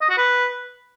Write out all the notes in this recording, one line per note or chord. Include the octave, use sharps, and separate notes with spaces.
D#5
F#4
B4